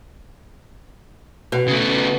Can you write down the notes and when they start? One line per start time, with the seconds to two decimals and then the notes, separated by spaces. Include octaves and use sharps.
1.52 B2
1.68 C#3 A3